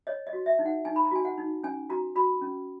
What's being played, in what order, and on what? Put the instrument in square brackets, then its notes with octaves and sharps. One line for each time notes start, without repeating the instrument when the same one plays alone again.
[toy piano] C#5 D#5
D#5
F#4
E5
D#4
F#5
D#4 G#5
B5
A#5
F#4 G#5
F#5
D#4
C#4 G#5
F#4 A#5
F#4 B5
C#4